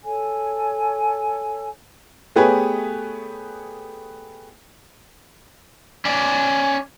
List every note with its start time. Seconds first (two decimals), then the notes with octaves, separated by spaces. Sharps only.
0.03 A4 C#5 G#5
2.36 A3 B3 G4 G#4 B4 C#5
6.05 C#4 D5